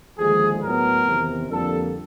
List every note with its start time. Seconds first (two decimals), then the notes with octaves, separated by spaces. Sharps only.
0.18 D#2 D3 F3 G#3 G#4
0.62 A2 F#3 B3 A#4
1.06 E2 C3 D#3
1.49 F2 D3 G3 A#3 D4 A4